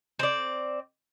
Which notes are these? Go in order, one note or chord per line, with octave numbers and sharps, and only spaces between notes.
C4 D5